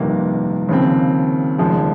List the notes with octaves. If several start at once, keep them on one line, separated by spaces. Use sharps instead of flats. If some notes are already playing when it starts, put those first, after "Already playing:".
Already playing: G1 F2 C3 D#3 A#3
D#2 C#3 F3 C4
F1 D#2 C#3 F3 G#3